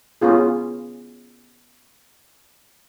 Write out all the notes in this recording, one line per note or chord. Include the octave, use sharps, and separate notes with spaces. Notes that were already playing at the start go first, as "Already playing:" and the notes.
B3 C#4 F4 G#4